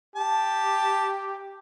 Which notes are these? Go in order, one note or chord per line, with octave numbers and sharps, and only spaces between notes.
G4 A5